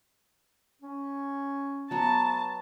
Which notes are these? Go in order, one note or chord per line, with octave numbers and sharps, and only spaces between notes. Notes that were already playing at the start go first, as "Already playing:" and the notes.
C#4
F#3 B3 A5